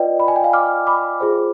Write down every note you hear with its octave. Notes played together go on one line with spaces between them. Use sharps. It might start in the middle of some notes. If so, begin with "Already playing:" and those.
Already playing: F4 B4 D5 D#5 G5
B5
G#5
G5
F5 G#5
D6 F6
B5 D6
F4 G#4 C5